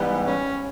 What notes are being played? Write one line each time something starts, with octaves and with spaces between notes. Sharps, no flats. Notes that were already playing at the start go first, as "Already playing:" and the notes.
Already playing: G#2 E3 G3 B3
C#4